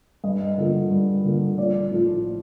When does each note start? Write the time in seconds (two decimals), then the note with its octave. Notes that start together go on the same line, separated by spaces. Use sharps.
0.24 G2 D#5
0.58 D3 F3 A#3
0.91 G2
1.24 D3 F3 A#3
1.58 A#1 D5
1.91 A2 F3